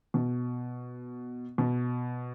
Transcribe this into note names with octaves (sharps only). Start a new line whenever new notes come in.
B2
B2